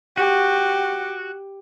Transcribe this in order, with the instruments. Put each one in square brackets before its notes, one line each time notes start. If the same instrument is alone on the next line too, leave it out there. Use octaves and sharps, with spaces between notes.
[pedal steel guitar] F#4 [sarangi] G4